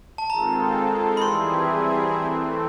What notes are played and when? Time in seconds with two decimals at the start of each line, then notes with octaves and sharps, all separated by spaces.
0.18 A5
0.30 D#3 G#3 C4 F4 A4 A#5
1.17 B5
1.22 E3 G3 C4 E4 G#4 C6
2.13 E3 A3 C4